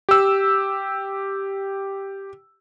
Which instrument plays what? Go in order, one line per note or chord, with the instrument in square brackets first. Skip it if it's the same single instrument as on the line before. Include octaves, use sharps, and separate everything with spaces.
[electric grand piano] G4 E6